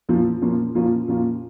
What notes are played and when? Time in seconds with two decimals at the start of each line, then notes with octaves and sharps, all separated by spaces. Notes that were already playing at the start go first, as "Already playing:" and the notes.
0.09 A#2 F3 A#3 C#4 F4
0.42 A#2 F3 A#3 C#4 F4
0.75 A#2 F3 A#3 C#4 F4
1.08 A#2 F3 A#3 C#4 F4